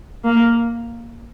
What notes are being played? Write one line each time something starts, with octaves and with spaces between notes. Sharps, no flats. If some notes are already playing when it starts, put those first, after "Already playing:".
A#3